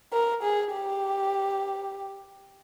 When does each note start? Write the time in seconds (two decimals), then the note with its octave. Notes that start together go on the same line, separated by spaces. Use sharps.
0.13 A#4
0.43 G#4
0.73 G4